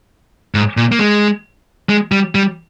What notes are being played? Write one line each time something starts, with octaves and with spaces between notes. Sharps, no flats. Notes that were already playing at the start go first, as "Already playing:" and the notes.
G#2
A#2
A#3
G#3
G#3
G3
G3